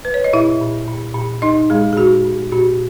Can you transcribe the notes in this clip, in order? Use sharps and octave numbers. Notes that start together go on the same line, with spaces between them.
B4
C#5
D#5
A#2 E4 E5
A#2
A#2
A#2
A#2 D#4 D#5
A#2 G#3 G#4
G#4
A#2 F#4
A#2
A#2 F#4